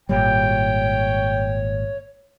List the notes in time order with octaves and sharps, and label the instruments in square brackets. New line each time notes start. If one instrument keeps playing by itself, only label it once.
[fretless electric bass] G#1 A#2 G3 [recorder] C#5 [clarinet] G5